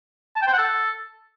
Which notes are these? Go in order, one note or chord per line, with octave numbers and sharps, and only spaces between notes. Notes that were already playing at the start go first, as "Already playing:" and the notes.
A5
G5
C5
F#5
A4